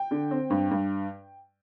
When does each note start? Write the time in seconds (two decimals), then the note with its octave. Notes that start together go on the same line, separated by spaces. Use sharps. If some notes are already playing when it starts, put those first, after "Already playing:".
Already playing: G5
0.11 D3
0.31 C4
0.50 G2
0.71 G2